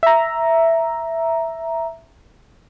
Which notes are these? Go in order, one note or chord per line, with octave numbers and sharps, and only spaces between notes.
E5 A#5